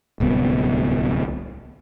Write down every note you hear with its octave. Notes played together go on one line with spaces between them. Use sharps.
D1 C2 B3